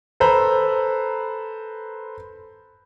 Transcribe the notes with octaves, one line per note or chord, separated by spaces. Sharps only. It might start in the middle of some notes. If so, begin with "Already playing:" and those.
A4 B4 C5 A#5 B5